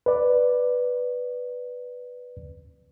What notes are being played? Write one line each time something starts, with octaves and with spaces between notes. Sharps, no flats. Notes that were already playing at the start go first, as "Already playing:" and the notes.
B4 D5